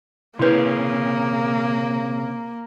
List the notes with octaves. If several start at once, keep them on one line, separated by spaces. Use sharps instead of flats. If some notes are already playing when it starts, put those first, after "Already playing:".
C3 A#3 C#4 E4 G#4 B4